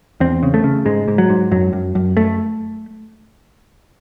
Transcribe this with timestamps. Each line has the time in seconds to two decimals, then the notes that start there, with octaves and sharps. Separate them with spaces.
0.20 E2 C4
0.43 C#3
0.54 A3
0.64 C#3
0.86 G#2 G#3
1.08 G#2
1.18 F#3
1.29 G#2
1.51 F#2 F#3
1.73 F#2
1.95 F#2
2.17 A3